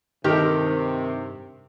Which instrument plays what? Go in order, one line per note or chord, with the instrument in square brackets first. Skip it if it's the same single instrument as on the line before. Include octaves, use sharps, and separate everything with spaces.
[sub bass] G2 [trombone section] C3 [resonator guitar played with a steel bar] D#3 [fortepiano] G4 A4